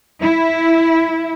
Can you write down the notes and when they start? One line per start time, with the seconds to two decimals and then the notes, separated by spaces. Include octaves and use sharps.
0.20 E4